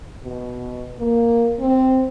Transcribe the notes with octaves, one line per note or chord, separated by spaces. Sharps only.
B2
A#3
C4